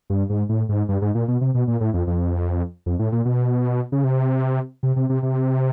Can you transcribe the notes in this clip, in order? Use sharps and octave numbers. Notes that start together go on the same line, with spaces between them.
G2
G#2
A2
G#2
G2
G#2
A#2
B2
C3
B2
A#2
A2
F2
F2
F2
A2
A#2
B2
C#3
C3
C3
C3
C3
C3